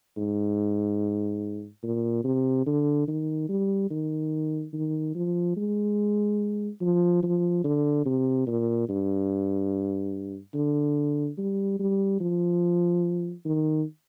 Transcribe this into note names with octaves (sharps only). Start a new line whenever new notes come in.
G#2
A#2
C3
D3
D#3
G3
D#3
D#3
F3
G#3
F3
F3
D3
C3
A#2
G2
D3
G3
G3
F3
D#3